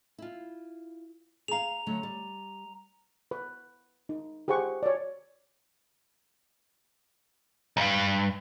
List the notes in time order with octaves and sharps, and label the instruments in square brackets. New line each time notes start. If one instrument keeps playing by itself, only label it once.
[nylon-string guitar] E4 F4
[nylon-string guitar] G#4 F5 [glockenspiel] A#5 F7
[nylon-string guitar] D3 F#3 A3
G3
[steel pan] B4
D#4
G4 G#4 C5 F#5 C#6
C#5 D5
[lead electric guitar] B1 G2